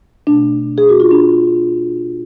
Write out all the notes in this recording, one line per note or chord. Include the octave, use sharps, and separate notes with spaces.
B2 A3 D4
G#4
F#4
F4
D4